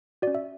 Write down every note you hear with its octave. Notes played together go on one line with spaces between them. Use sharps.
C#4 F#4 D5
E5